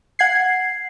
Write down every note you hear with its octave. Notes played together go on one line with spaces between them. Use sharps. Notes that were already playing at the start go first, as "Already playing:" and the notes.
F#5 G#6 C7